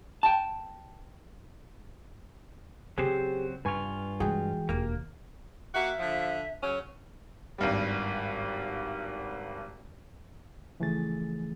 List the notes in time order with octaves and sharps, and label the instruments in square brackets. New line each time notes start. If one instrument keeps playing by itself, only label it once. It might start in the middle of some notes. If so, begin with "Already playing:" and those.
[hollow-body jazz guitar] G5 A5
[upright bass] C#3 [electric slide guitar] F#3 C4 C5 [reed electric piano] G4 G#4
[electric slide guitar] G2 F4 [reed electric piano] B4 G#5 C#6
[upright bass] E3 G#3 [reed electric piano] F#4 G#4 G5
[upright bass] E1 D#2 [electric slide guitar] A#3
[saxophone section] A#3 F#4 [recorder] E5
[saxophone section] D3 F3
C#3 F#3 C#4
[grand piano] G#1 G2 G3
[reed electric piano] C#3 E3 F3 A3 G#4 A6